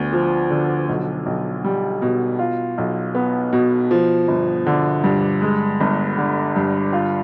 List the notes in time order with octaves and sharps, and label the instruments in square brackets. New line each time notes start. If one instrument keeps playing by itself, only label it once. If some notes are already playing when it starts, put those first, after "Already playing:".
Already playing: [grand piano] D2 B3
F3
D3
B1
B1
G3
B2
F4
B1
B3
B2
F3
G1
D3
G2
G#3
G1
D3
G2
F4